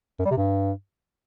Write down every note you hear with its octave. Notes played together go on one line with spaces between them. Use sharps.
F#2
G3
C3
G2